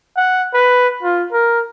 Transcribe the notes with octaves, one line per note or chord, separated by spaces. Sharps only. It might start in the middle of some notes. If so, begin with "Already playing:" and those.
F#5
B4
F4
A#4